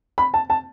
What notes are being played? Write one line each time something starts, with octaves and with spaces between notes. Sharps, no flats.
B5
A5
A5